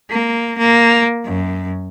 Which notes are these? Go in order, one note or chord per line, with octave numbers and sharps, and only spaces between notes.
A#3
A#3
F#2